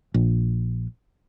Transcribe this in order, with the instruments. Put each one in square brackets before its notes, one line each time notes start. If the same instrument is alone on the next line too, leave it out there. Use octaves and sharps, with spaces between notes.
[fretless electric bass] A#1